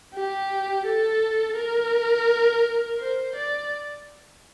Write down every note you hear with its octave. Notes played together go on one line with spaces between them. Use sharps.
G4
A4
A#4
C5
D5